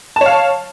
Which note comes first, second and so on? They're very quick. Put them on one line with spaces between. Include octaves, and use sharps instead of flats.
A5 C#5 F5